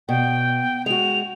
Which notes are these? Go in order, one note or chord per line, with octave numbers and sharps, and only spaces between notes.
B2 G5
G#3 F#4 F7